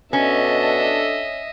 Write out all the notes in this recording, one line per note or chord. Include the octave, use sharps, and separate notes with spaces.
B2 C#4 D4 A4 D#5 E5